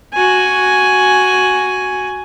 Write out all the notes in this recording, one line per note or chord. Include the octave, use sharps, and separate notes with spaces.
F#4 G#5